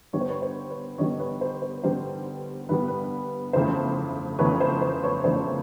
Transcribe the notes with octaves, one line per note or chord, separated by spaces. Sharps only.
G2 D3 G3 B3 C#5
C5
B4 C#5
C5
B4 C#5
G2 D3 G3 B3 C#5 D#5
B4 C#5
C5
C5
G2 D3 G3 B3 C5
G2 D3 G3 B3 B4
B4
G1 F2 C#3 E3 A3 C5
G1 F2 C#3 E3 A3 B4 C#5
C5
C5
B4 C#5
G1 F2 C#3 E3 A3 C5 D5